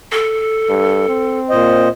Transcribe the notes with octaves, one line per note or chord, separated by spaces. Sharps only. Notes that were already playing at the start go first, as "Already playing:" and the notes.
A4
G2
C4
A#2 C5 D#5